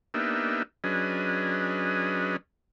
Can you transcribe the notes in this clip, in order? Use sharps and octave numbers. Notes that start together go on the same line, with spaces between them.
A#3 B3 D4 D#4 G4 E5
F#3 C#4 D4 G#4 B4 D#5